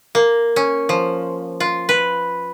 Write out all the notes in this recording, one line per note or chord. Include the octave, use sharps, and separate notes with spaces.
A#3
C#4
F3
F4
B4